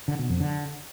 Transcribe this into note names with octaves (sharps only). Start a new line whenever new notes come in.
D3
B2
F2
D3